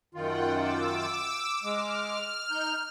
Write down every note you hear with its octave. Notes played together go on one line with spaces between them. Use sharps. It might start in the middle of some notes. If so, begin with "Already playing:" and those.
F#2 D#3 F4 F#5 G5
D6 E6
G#3 D6 F6
D#4 G6